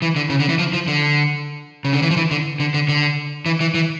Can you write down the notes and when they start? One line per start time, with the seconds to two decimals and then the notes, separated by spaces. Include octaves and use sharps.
0.02 E3
0.16 D3
0.30 C#3
0.40 D3
0.49 E3
0.59 F3
0.73 F3
0.88 D3
1.85 C#3
1.93 D3
2.02 E3
2.11 F3
2.17 E3
2.31 D3
2.60 D3
2.74 D3
2.89 D3
3.46 E3
3.61 E3
3.74 E3